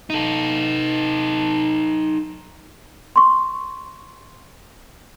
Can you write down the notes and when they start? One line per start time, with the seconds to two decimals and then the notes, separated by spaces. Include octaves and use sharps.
0.10 D#4 A4
3.16 C6 C#6